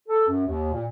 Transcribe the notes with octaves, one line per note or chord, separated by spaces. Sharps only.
A4
F#2
D#2
A#2